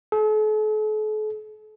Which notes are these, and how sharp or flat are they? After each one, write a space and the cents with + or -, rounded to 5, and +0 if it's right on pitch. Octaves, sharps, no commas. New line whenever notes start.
A4 -45